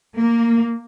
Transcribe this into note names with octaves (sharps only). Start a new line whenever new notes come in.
A#3